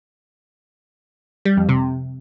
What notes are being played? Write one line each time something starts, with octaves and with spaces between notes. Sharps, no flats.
G3
F2
C3